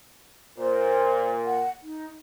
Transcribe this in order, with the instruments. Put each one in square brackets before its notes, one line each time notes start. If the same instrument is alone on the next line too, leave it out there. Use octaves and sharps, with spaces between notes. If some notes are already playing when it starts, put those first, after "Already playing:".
[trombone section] A#2 [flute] C5
[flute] F#5
D#4